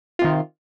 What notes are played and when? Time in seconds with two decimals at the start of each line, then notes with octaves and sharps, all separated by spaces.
0.19 F4
0.22 C3
0.24 D#3